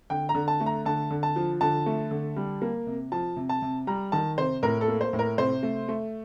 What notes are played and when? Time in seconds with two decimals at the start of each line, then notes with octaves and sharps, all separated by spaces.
0.10 D3 G5
0.29 A#5
0.35 D3
0.48 A5
0.60 A3
0.66 A#5
0.85 D3 A5
1.11 D3
1.23 A5
1.36 F3
1.61 D3 A5
1.86 A3
2.11 D3
2.36 G3
2.62 A#3
2.87 C3
3.12 F3 A5
3.37 C3
3.49 A5
3.62 C3
3.87 G3 A#5
4.12 D#3 A5
4.38 C3 C5
4.63 A2 A#4
4.81 A4
4.88 A#3
5.01 C5
5.13 A2
5.19 A#4
5.38 C3 C5
5.63 A3
5.88 A3